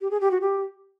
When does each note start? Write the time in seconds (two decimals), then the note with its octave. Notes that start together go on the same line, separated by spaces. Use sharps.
0.01 G4
0.11 G#4
0.21 G4
0.31 F#4
0.41 G4